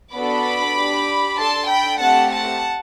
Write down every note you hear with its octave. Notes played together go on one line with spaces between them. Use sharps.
B3 D4 F#4 A4 B5 D6
D4 G4
D4 A4 A5 C6
G5 B5
A3 C4 G4 F#5 A5
F#5 A5